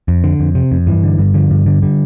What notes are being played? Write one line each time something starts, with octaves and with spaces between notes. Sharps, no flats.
F2
D3
F2
C3
F2
G2 E3
D3
G2
D3 F3
G2
D3
D3 G3